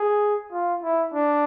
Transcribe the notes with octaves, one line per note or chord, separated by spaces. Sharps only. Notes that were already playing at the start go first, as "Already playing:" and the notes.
Already playing: G#4
F4
E4
D4